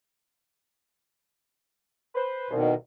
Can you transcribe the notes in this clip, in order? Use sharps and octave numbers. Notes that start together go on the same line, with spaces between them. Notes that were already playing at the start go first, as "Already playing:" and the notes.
B4 C5
C2 B2 D#3